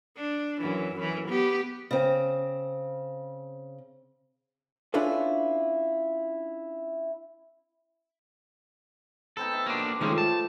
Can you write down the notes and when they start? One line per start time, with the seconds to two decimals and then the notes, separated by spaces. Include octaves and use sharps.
0.17 D4
0.61 F#2 E3
0.96 F#2 E3
1.29 B3 G4
1.91 C#3 C4
4.94 C#4 D4 E4 F4 A4 B4
9.37 B3 C4 D#4 A4
9.51 D#5 E5
9.66 A#3 D4 F#4 C6
9.79 F5 D6
10.00 D#3 F3 G#3 A3 C4 C#4
10.18 A5